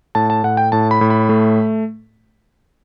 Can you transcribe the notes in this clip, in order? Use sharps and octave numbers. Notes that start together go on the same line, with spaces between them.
A2 A5
A5
A2 F#5
G5
A2 A5
B5
A2
B5
A3